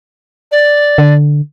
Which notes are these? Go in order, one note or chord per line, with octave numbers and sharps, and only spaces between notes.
D5
D3